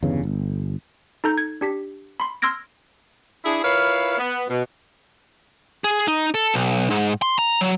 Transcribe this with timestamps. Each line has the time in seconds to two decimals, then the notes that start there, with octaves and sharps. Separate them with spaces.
0.02 G1 E2 G2 C#3
0.23 G1
1.24 D#4 A4 A#5 G6
1.38 G#6
1.61 D4 G4 B6
2.20 B5 C6
2.42 C6 E6 F6 G#6 A#6 D7
3.44 D4 E4 G#4
3.62 E4 F4 A#4 B4 C#5 F5
4.18 B3
4.49 B2
5.84 G#4
6.08 D#4
6.34 A4
6.54 B1
6.90 G#2
7.22 C6
7.39 A#5
7.61 F#3